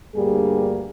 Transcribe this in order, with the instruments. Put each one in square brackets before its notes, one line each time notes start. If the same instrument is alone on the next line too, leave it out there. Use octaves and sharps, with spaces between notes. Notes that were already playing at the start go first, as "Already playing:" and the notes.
[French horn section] D2 G2 G3 A#3 G#4